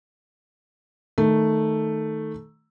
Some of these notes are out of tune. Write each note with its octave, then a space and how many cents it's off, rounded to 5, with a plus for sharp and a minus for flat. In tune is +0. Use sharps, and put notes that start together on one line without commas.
D#3 +0 A3 +0